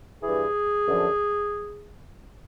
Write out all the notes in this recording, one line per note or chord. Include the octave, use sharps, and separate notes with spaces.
G2 E3 G#4
F#2 D3 F3